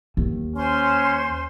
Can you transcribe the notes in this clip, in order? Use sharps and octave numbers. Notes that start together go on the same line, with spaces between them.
D#2
C#4 C5 G#5 C6